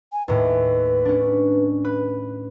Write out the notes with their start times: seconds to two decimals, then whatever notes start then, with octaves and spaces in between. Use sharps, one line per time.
0.13 G#5
0.28 D#2 A2 B4
1.05 C#4 D4
1.85 B4